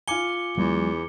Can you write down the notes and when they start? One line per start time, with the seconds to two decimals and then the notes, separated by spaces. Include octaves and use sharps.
0.08 F4 G#5 D6 C#7 G7
0.58 E2 F#3 G#3